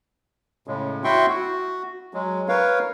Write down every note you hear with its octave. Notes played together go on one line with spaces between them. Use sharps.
A2 C#3 G#3
E4 F#4 E5 G5 C6 C#6
F#4
F#3 G#3
A#4 B4 C#5 F5